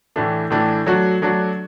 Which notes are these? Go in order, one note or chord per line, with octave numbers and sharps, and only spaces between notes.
A2 E3 A3 D4
A2 E3 A3 D4
F#3 A3 D4 F#4
F#3 A3 D4 F#4